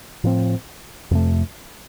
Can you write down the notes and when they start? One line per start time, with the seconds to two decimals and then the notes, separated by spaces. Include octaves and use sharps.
0.24 A2 F3 C4
1.11 F2 C3 A3